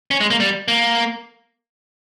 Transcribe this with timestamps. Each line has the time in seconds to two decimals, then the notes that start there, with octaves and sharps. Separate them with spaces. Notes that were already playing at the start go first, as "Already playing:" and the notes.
0.11 C#4
0.21 G#3
0.30 A#3
0.40 G3
0.68 A#3